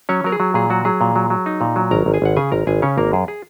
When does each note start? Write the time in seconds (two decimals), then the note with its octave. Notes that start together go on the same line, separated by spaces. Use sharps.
0.09 F#3 C#4 C#5
0.24 F#3 A#4
0.32 G#4
0.40 F#3
0.54 A#2 G#4
0.70 F#3 F#4
0.85 F#3 G#4
1.01 A#2
1.16 F#3
1.30 F#3
1.46 D#4
1.61 A#2
1.76 F#3
1.91 G#1 A#4 A#5
2.06 G#1
2.14 G#4 G#5
2.22 G#1 F#5
2.36 C#3 G#4 G#5
2.52 G#1 A#4 A#5
2.67 G#1 G#4 G#5
2.82 C#3 C#4 C#5
2.97 G#1 A#3 A#4
3.13 F#2 G#4
3.28 G#4